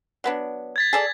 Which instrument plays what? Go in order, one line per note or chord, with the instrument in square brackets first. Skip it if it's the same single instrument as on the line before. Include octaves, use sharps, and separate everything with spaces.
[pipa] F#3 B3 D4
[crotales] G#6 A6 B6
[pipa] G#4 A4 D5